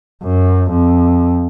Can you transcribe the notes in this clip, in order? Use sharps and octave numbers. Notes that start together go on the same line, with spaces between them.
F#2
F2